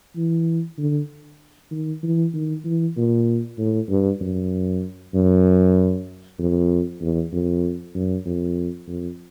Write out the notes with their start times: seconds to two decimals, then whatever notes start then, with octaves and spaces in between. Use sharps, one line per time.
0.16 E3
0.78 D3
1.71 D#3
2.03 E3
2.34 D#3
2.65 E3
2.97 A#2
3.58 A2
3.89 G2
4.21 F#2
5.14 F#2
6.39 F2
7.01 E2
7.32 F2
7.95 F#2
8.25 F2
8.88 F2